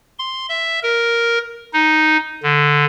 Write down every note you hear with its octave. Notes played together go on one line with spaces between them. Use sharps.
C6
E5
A#4
D#4
D3